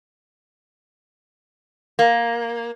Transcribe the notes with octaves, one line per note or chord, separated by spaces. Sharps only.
A#3